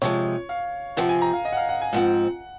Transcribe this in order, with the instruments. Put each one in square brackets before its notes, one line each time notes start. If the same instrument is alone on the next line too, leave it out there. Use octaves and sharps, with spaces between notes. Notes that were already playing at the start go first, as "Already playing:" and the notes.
[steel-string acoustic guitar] C3 F3 G#3 [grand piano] C#5
[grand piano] F5
[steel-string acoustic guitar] C3 F3 C4 [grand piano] F#5
[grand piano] G#5
A#5
F5
D#5
F#5
F5
F#5
G#5
[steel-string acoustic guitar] G#2 F3 C4 [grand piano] F#5